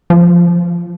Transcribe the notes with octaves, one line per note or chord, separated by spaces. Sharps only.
F3